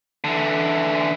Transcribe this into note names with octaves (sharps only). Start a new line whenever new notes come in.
D3 E3